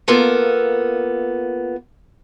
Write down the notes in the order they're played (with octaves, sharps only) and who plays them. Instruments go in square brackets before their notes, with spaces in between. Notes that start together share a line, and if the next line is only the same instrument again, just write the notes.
[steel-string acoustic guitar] A#3 B3 F4 A4 A#4